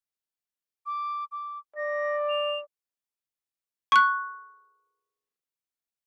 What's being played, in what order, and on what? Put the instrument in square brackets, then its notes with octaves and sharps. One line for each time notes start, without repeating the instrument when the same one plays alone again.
[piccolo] D6
D6
[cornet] D5 [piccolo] A#6
[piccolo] F7
[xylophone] C#6 F#6